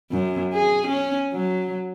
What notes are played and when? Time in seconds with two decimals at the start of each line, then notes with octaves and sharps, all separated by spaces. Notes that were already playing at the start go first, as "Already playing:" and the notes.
0.11 F#2
0.54 G#4
0.87 C#4
1.33 F#3